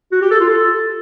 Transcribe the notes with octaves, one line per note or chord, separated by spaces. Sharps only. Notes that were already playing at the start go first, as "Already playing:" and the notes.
F#4
G4
A4
F4
A4